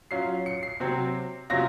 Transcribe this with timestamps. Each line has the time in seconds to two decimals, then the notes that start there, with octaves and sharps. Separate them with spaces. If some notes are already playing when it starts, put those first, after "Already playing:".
0.11 F#3 C#4 F4 C7
0.46 C#7
0.63 C7
0.80 C3 F#3 C4
1.50 C3 F#3 C#4 F4 A#6